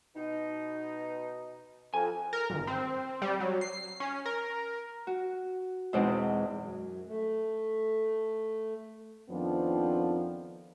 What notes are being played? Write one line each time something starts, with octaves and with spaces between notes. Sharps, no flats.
B2 D#4
F2 G#5
A#4
G#1
C4
G3
F#3
C7
C#4
A#4
F#4
E2 G#2 B2 G#3 C4 D#4
F#2
A3
F2 D#3 F3 B3 C4 D4